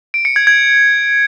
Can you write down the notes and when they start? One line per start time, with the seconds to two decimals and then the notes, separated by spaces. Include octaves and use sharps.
0.14 D7
0.25 C#7
0.36 G#6
0.47 G#6